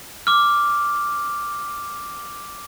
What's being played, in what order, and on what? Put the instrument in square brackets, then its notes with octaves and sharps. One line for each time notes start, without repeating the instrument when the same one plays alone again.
[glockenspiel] D6 F6